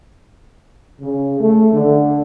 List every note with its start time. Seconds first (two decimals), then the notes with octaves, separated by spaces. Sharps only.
1.02 C#3
1.40 A3
1.73 D3